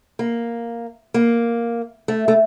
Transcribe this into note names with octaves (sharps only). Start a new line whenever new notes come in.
A#3
A#3
A3
A3